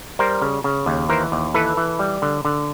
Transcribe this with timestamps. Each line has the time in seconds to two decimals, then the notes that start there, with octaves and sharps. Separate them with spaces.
0.19 G3 A#4 C5
0.42 C#3
0.64 C#3
0.86 D#2
1.09 E3 A#4 C5
1.32 D#2
1.54 E3 A4 B4
1.77 E3
1.99 G3
2.22 D3
2.45 D3